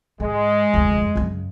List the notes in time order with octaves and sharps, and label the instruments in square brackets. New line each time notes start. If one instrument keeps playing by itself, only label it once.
[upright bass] G#2 [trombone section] G#3
[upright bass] F1 D2
F#2 C#3